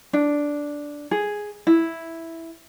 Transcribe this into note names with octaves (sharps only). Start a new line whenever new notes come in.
D4
G#4
E4